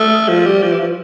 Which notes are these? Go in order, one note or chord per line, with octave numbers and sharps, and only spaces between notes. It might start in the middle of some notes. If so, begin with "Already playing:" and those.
Already playing: A3
F3
G3
F3
E3
F3